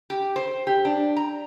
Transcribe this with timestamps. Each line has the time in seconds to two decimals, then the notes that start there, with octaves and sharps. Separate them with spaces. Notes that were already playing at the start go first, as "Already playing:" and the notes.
0.10 G4
0.36 C5
0.67 G4
0.85 D4
1.17 A#5